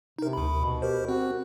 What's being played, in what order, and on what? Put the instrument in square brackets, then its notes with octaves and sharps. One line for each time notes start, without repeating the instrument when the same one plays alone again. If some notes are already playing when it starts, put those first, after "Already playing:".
[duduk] C3 [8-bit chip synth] D#4 A#4
[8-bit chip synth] D2 B5
[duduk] B2
[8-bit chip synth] G4 A#4 C5
[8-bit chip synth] C4 [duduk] F#4